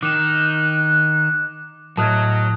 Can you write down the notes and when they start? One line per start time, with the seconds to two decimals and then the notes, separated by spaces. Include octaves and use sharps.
0.03 D#3 D6 F#6 E7
1.97 A2 F#3 D#5 A5 D#6 F6 F#6 G#6